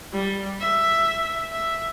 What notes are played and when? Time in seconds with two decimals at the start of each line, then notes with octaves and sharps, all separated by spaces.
0.13 G3
0.60 E5
1.51 E5